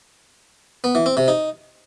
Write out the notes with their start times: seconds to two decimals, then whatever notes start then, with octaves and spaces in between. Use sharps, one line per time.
0.84 B3
0.95 E3
1.06 C4
1.17 C3
1.28 D#4